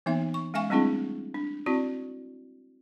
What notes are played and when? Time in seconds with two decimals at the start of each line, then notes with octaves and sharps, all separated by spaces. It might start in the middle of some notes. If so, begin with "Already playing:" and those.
0.06 E3 A#3 B3 D#4 E5
0.34 C#6
0.54 G#3 C#4 E5 F5 G#5 C#6
0.70 G3 A3 C4 D4 E4 G#4
1.34 D4
1.66 C4 E4 F#4 D5